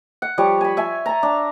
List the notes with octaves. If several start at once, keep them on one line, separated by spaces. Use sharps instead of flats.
F#5
F3 G3 C#5
G#5 B5
E5 G#5
A5 A#5
D4